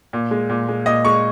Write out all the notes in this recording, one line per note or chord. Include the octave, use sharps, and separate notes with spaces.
A#2
G#3
A#2
G#3
A#2 D#5
G#3 C#6